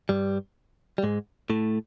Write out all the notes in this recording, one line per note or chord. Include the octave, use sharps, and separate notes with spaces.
G2 G3
G3
G#2 G#3
A2 A3